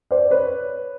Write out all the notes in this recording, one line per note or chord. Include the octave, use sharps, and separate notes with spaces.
C5 D5
B4 C#5